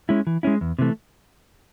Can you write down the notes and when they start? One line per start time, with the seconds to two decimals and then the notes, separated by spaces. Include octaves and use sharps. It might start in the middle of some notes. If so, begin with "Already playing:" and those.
0.09 G#3 C#4 E4
0.27 E3
0.43 G#3 C#4 E4
0.61 E2
0.79 C3 E3 A3